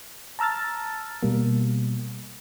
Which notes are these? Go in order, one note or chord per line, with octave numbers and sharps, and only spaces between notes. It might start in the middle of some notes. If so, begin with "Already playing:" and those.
A5 A#5 E6 F6 A6
B2 G3 A#3